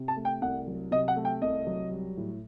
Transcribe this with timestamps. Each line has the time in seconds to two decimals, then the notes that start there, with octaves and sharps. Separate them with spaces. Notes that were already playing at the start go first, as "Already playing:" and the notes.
Already playing: C3
0.08 A5
0.16 A3
0.25 G5
0.42 C2 F#5
0.67 F#3
0.91 C3 D#5
1.08 F#5
1.16 A3
1.25 G5
1.42 C2 D#5
1.67 F#3
1.91 G3
2.17 A2